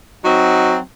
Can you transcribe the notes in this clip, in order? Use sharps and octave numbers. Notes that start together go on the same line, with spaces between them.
F#3 C4 D#4 F#4